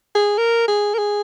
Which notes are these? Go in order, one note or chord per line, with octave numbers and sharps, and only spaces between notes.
G#4
A#4
G#4
A#4
G#4